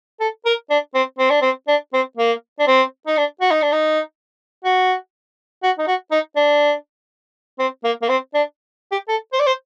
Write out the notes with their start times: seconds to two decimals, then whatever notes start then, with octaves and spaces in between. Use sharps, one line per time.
0.20 A4
0.46 A#4
0.70 D4
0.95 C4
1.19 C4
1.30 D4
1.42 C4
1.68 D4
1.94 C4
2.17 A#3
2.60 D4
2.67 C4
3.07 D#4
3.17 D4
3.41 F#4
3.51 D#4
3.62 D4
3.72 D#4
4.64 F#4
5.63 F#4
5.79 D#4
5.87 F#4
6.11 D#4
6.36 D4
7.59 C4
7.84 A#3
8.02 A#3
8.09 C4
8.34 D4
8.92 G4
9.08 A4
9.33 C5
9.40 D5
9.47 C5